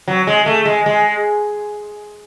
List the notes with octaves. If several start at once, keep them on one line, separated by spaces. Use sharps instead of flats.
F#3
G#3
A3
G#3
G#3